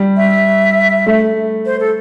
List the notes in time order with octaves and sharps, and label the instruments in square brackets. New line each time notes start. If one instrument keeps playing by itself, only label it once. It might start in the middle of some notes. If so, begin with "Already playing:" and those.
Already playing: [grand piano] G3
[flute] E5
[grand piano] A3
[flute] C5
A4